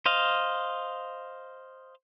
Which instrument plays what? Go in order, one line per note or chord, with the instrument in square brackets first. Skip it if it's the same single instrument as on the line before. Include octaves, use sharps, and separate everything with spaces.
[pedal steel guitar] C5 D#5 F5